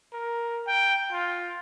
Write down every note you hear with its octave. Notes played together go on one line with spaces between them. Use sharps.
A#4
G5
F4